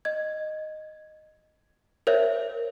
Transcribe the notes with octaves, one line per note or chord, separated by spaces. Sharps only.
D#5 G#6
A#4 C5 C#5 E5